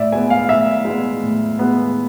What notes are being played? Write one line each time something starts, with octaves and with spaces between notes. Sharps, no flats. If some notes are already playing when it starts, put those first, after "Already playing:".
Already playing: A2 D5 E5
G#3 B3 G#5
F5
A2 E5
G#3 B3
A2
G#3 B3